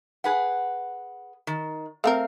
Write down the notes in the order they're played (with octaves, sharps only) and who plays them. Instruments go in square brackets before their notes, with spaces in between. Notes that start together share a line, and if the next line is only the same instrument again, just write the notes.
[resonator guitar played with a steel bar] G#4 B4 F#5
D#3
[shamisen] A3 C4 A#4 [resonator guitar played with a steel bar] F5